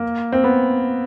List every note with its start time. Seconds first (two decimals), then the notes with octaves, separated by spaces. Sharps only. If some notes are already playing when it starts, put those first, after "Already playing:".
Already playing: A#3
0.32 C4
0.44 B3